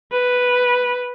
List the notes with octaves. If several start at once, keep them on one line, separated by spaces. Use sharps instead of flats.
B4